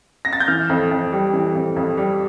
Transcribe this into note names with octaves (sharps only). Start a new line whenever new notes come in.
A#6
A6
G6
E3 F6
F2
F2
G3
E3
F2
F2
G3